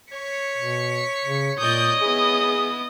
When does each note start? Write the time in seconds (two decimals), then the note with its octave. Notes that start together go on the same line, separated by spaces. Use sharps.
0.12 C#5 B6 C#7
0.58 B2
1.24 C#3
1.58 A#2 D5 D#5 D#6 G6
2.01 B3 E4 G#4